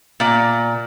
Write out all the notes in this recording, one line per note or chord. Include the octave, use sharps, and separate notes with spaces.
A#2 D5